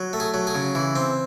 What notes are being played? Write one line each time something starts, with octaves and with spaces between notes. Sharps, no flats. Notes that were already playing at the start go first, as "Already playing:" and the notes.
Already playing: F#3
A3
G#4
F#3
G#4
C#3
E3
C4